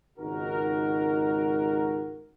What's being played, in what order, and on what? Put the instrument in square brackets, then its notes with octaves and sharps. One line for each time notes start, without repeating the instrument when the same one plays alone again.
[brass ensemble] G#1 C#2 D#4 F#4 A#4